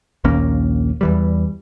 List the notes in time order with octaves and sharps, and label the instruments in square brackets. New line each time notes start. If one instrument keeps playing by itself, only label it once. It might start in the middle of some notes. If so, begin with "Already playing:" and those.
[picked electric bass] A#1 D#2 A#3 C#4
E2 E3 G3